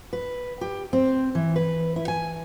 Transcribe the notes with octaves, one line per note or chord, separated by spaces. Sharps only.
B4
G4
C4
E3
B4
E4
G#5